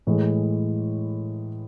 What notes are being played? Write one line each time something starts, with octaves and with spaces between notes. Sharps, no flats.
A2 E3 G#3